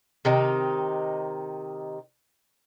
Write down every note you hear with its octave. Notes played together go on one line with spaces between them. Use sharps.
C3 D#3 D#4